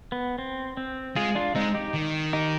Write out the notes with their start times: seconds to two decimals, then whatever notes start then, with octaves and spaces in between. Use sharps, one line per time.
0.12 B3
0.38 C4
0.77 C4
1.16 G#3 F4 G#4
1.35 D4 F4
1.55 G#3 C4 D#4
1.74 D#4 G4
1.94 D#3
2.33 D#4 G4